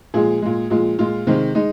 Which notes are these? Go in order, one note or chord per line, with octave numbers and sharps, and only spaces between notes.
A#2 F3 G#3 G#4
A#2 G#3
A#2 F3 G#3
A#2 G#3 F4
C3 D#3 G#3
G#3 D#4